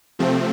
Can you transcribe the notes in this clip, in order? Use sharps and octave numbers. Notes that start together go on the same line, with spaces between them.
C3 F3 A3 C4